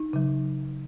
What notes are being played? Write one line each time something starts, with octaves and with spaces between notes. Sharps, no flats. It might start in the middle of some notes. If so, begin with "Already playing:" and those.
Already playing: D#4
C#3 F#3